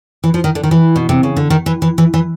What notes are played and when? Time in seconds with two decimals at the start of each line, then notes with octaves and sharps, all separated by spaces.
0.24 E3
0.34 F3
0.44 D#3
0.55 D3
0.63 D#3
0.71 E3
0.96 B2
1.09 C3
1.23 C#3
1.37 D3
1.50 D#3
1.66 E3
1.82 E3
1.98 E3
2.14 E3